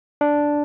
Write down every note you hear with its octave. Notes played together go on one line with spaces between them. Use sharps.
D4